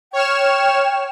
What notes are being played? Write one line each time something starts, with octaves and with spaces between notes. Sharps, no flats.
C#5 G5 F6 E7